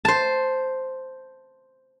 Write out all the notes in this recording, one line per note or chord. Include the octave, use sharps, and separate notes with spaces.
C5 A5